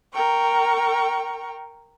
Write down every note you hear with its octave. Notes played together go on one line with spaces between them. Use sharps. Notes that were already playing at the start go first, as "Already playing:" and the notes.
A#4 G5 C#6